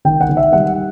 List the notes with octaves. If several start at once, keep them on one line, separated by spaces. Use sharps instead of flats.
D#3 G5
F#5
D#3
E5
G3 F#5